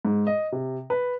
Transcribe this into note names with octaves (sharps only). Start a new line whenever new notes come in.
G#2
D#5
C3
B4